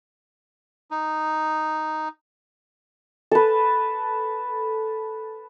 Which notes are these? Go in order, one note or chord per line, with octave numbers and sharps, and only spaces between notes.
D#4
A4 B4